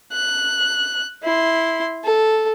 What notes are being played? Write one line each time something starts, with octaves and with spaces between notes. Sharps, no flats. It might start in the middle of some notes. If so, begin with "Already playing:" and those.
F#6
E4 C6
A4